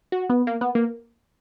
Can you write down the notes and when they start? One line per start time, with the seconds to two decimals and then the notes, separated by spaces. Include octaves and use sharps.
0.12 F#4
0.30 B3
0.47 A#3
0.61 B3
0.75 A#3